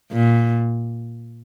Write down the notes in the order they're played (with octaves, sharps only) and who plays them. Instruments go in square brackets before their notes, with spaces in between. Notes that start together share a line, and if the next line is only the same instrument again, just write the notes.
[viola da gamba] A#2